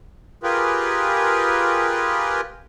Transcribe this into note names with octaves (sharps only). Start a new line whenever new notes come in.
F4 G4 G#4 A#4 B4